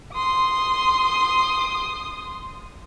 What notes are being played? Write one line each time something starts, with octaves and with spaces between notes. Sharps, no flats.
C6 D#6